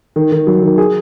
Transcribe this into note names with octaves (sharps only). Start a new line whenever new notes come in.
D#3
D#3
F#3
D#3
G#4